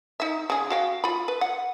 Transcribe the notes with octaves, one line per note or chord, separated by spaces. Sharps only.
D#4 E5
C#3 G#4
F#4 F5 G5
F4 B5
B4
F#5